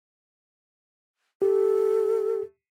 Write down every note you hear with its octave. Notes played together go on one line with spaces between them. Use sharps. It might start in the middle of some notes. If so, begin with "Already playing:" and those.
G4 A4